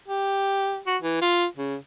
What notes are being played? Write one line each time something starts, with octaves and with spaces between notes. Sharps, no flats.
G4
F#4
E3
F4
C#3